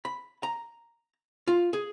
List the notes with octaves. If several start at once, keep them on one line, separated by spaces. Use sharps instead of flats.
B5
A#5
F4
G#4